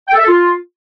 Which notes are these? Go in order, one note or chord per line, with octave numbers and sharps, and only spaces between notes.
G5
A4
E5
A4
F4